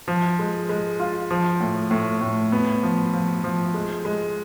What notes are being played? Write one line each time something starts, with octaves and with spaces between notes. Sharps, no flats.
F3
G#3
G#3
F4
F3
A2
A2
A2
B3
F3
F3
F3
G#3
G#3